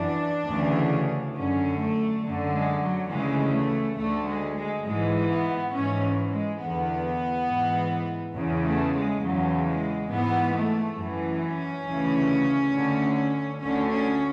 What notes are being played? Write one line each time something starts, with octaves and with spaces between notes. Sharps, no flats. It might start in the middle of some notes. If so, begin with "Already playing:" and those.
Already playing: F#2 E3 D4
D2 C#3 E3
F#2 D3 C#4
A3
F#2 D3
G#3
F#3
D2 C#3 E3 G#3
A3
D2 D3 A3
G#3
G#3
G#2 E3 G#3
B3
G#2 E3 C#4
G#3
E2 D3 B3
G#2 E3
E2 C#3 E3
A3
G#3
E2 C#3 E3 F#3
G#3
G#2 E3 B3
A3
F#2 E3
C#4
D2 C#3 E3
D2 D3
D2 D3 C#4
C#4